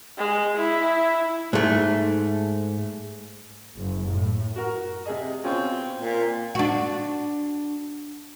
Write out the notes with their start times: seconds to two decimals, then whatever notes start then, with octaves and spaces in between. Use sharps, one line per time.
0.18 G#3
0.57 E4
1.53 G#2 A3
3.76 F#1
4.07 A2
4.56 F#4 A#4
5.06 C3 G#4 D#5
5.44 B2 C4 C#4 F4
5.99 A#2
6.55 D4 F#4